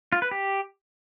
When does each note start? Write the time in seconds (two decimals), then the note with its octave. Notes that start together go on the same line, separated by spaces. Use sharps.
0.12 F4
0.22 B4
0.31 G4